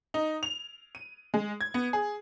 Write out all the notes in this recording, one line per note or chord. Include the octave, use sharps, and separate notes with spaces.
D#4
F7
D#7
G#3
G#6
B3
G#4